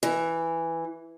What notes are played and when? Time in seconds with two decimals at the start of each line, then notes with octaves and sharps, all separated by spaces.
0.03 E3